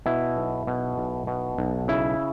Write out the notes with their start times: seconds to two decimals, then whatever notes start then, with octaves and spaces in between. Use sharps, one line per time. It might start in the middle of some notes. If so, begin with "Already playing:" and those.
0.06 B2 E4
0.37 B1
0.67 B2
0.98 B1
1.27 B2
1.58 B1
1.88 C#3 E4